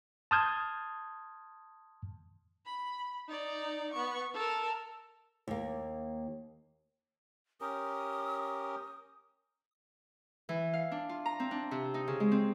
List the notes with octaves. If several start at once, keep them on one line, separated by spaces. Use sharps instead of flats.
A5 C6 D#6 F6 G6 G#6
B5
D#4 D5
B3 C#6
A4 A#4
D#2 A#3
C#4 G4 A#4 D#6
E3
F5
D4
F4
A#5
C4
D4
C3
D#4
C#3
G#3
C4